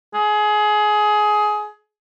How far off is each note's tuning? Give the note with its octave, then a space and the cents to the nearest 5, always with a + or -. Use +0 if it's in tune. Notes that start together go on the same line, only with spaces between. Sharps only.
G#4 +20